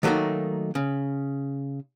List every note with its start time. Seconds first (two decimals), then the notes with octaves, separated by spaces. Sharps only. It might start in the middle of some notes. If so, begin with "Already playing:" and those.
0.03 D#3 F#3 A3 A#3 D#4
0.75 C#3